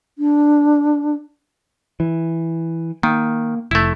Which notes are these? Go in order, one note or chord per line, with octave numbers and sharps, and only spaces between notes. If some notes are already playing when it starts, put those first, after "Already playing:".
D4
E3
D#3 A#3
F1 A3 E4